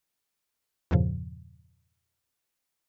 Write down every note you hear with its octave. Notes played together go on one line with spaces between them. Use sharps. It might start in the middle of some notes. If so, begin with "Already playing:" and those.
E2 G2 A#2 C#3 F3